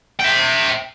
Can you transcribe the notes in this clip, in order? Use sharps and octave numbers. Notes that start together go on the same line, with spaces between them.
E5 G5